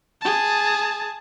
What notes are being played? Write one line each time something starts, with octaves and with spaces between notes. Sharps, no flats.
G#4 A5